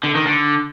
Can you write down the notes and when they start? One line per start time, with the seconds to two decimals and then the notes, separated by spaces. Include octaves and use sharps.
0.03 D3
0.15 D#3
0.26 D3